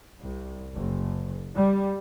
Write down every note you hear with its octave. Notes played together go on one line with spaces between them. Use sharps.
C2
F#1
G3